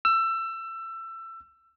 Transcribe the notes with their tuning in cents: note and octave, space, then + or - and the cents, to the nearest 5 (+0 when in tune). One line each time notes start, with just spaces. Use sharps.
E6 +25